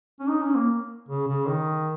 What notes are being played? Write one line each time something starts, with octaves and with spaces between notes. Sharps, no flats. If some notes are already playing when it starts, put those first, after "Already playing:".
C#4
D#4
C#4
A#3
C#3
C#3
D#3